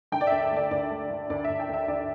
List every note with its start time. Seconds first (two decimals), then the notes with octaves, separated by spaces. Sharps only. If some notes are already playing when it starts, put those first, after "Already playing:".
0.12 D3 G5
0.21 D5
0.27 D2 E5
0.42 E5
0.52 A3 D5
0.71 D2 D5
0.91 A3
1.10 D3
1.30 D2 D5
1.45 E5
1.50 D2
1.60 G5
1.69 D2 E5
1.88 D2 D5